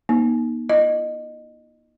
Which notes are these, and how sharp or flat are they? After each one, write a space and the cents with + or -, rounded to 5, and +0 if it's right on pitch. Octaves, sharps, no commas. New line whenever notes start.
A#3 +45 D#4 +0
F4 -45 D#5 -20